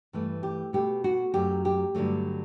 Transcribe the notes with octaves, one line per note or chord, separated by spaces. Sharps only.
G2 E3 A3
G4
B2 A3 G4
F#4
F#2 F#3 A3 G4
G4
G2 D3 F#3 A3